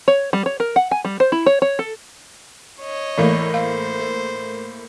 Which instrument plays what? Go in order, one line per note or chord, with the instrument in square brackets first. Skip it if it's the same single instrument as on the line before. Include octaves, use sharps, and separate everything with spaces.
[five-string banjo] C#5
G3
C#5
A#4
F#5
G#5
G3
C5
E4
C#5
C#5
A4
[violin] C#5 D#5
[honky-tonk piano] A2 A3 A#3 [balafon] E3 F5
[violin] C5 [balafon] F5
[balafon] A#4